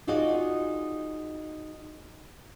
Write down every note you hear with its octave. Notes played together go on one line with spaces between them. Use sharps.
D#4 F4 F#4 G#4 D5 D#5